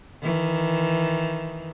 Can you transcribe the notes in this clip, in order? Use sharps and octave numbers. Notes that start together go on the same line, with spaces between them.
D#3 E3